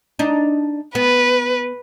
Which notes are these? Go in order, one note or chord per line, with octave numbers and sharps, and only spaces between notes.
D4 D#4
B3 B4